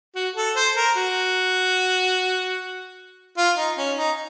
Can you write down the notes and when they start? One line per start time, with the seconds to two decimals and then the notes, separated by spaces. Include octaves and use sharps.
0.15 F#4
0.36 A4
0.56 C5
0.76 A#4
0.96 F#4
3.37 F4
3.57 D#4
3.78 C#4
3.98 D#4